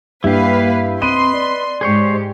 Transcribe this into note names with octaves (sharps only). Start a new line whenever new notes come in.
G2 A#3 E4 G4 B4 F5
C4 B4 D#5 C6 D#7
D5
G#2 G4 G#4 C5 C#5